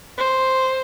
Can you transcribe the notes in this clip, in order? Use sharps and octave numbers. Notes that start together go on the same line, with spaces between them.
C5